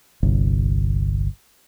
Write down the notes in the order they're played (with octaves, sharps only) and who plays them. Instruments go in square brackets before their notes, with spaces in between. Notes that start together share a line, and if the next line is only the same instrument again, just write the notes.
[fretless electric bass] G1 C2